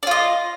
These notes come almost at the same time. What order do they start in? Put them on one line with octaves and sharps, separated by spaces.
D5 F4 D#5